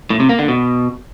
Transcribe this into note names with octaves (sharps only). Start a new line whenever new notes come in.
A2
C3
A#3
D3
B2